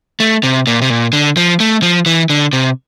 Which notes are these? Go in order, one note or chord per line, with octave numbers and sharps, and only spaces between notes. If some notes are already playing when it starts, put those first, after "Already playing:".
A3
C3
A#2
C3
A#2
D3
F3
A3
F3
E3
D3
C3